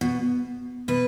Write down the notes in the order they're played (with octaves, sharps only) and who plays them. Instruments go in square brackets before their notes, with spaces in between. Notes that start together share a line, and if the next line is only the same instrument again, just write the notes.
[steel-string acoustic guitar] B2
B2 B4